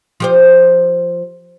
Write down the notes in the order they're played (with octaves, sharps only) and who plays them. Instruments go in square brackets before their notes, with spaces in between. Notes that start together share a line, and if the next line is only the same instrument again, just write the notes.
[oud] F3 G4 C5